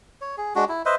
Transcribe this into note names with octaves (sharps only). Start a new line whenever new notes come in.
C#5
G#4
G#3 D4 F#4
E4
B4 C5 D#5 E5